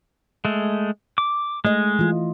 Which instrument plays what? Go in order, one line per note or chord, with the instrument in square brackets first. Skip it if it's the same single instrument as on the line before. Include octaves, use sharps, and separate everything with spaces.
[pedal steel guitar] G#3 A3
D6
[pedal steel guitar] G#3 [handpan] A3 D#5
[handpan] E3 F4